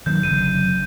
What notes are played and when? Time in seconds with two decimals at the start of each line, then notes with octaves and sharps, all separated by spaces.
0.06 D#3 F#3 A#3 G6
0.23 F#1 D3 D#7